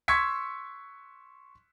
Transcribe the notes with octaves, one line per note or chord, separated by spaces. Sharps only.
C6 C#6 E6 G#6 B6 C#7